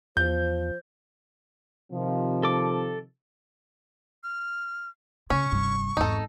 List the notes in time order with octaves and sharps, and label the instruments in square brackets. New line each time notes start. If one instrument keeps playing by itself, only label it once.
[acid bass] E2 [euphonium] F3 [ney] C5 [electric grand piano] G6
[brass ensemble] C3 D#3 F3
[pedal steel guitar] A4 D6
[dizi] F6
[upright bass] C#3 [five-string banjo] C#4 [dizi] C#6
[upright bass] F1 G2
[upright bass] G#1 E2 [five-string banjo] D#4 A4